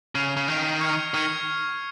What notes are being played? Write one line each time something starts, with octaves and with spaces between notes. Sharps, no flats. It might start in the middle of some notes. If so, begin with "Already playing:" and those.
C#3 F6 C7 F7
C#3
D#3 F6 C7 F7
C#6 F6 G#6 C#7
D#3 C#6 F6 G#6 C#7